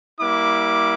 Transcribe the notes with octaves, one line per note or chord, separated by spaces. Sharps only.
G3 A#3 E4 D6